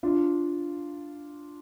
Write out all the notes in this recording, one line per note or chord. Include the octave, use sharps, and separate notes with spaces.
D4 F4